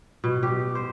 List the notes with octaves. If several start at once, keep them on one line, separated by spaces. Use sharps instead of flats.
B2
G4
C5